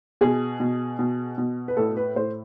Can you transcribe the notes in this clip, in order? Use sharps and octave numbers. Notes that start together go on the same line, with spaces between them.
B2 G#4
B2
B2
B2
B4
A2 A4
B4
A2 C5